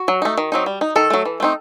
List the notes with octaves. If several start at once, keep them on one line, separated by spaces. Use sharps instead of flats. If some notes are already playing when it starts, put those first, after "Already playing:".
Already playing: F#4
F#3
A3 D#4
D#3
F#3 C4 D#4
G3
D#4
D#3 A4
F#3 A3
E3
A3 C4 D#4